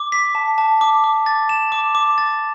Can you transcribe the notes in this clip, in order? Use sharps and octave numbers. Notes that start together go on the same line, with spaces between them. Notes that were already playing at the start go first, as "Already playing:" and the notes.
Already playing: D6
B6
A5
A5
D6
D6
A6
E7
D6
D6
A6